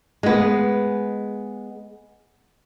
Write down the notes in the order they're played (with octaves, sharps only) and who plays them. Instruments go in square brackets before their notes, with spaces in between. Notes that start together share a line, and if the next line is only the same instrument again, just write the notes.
[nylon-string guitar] G#3 B3